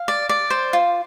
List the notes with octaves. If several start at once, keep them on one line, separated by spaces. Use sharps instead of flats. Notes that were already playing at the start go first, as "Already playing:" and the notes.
Already playing: F5
D5
D5
C5
F4